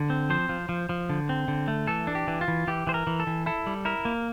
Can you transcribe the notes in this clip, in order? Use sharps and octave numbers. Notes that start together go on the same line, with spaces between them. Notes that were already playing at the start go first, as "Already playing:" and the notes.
Already playing: D3
C4
F3 C5
F3
F3
F3
D3
C4
D3
A3
E3 A4
D4
G4
E3
F4
E3
E3 G4
E3 C5
A#4
E3
A4
E3
E4 A4
G3
E4 A#4
A#3